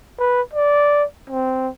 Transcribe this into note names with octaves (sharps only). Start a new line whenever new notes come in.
B4
D5
C4